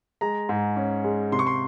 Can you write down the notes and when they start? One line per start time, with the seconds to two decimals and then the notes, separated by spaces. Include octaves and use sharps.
0.21 G#3 A#5
0.49 G#2
0.76 C#4
1.04 G#3
1.32 C3 C6
1.39 C#6
1.47 C6